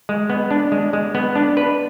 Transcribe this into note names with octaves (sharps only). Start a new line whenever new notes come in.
G#3
B3
D4
G#3
G#3
B3
D4
B4